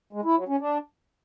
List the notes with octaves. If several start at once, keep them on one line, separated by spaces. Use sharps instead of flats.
G#3
E4
F#3
C#4
D4